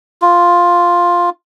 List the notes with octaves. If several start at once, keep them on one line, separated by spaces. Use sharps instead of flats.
F4